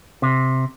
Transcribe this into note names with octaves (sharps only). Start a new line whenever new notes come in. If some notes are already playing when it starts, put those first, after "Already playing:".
C3